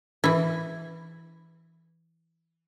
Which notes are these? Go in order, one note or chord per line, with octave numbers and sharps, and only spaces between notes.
E3 E4